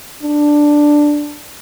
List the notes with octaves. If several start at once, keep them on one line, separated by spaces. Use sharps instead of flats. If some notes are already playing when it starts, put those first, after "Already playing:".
D4